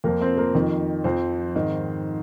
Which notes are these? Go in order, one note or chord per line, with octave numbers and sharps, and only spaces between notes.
F2 F3 A#3 A#4
C4 C5
A#3 A#4
F2 D#3
F2 F3 C4 C5
G#2 D#3